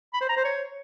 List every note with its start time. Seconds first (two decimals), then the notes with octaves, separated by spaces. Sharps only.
0.13 B5
0.21 C5
0.29 A#5
0.37 C5
0.45 C#5